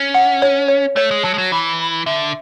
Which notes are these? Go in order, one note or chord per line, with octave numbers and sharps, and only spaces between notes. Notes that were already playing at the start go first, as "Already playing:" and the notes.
Already playing: C#4
F#5
C#5
C#5
A3 C#5
G#3
F#3 A5
G#3
F#3
E3 B5
B5
D3 E5